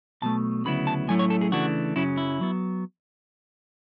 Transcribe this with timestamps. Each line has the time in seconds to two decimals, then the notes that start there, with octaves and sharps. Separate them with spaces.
0.22 B1 B2 A3 A5
0.65 D2 C#3 F#3 B3 E4 B5
0.87 A5
1.08 A2 F#3 A3 C#4 E4 G#5
1.19 C#5
1.30 A4
1.41 G#4
1.52 C#3 E3 A3 D4 F#4
1.96 F#2 C#3 F#3 C#4 E4
2.17 E4
2.41 F#3 B3